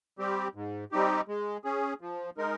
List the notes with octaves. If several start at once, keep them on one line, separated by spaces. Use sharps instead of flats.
G3 C4 G4
G#2
G3 C4 D#4 G4
G#3
C#4 G#4
F3
G#3 D#4 A#4